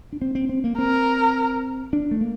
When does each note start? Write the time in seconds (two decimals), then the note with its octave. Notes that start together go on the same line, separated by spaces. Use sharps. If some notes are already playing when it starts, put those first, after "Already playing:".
0.13 D4
0.22 C4
0.35 C4
0.49 C4
0.64 A#3
0.78 C4 A#4
1.93 D4
2.11 A3
2.21 A#3